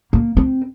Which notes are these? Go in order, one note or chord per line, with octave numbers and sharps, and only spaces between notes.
A#3
C4